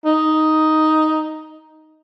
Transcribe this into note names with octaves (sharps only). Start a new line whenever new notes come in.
D#4